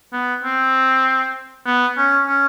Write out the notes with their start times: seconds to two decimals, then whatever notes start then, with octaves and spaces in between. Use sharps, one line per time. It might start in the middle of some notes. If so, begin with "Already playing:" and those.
0.13 B3
0.44 C4
1.66 B3
1.98 C#4
2.27 C#4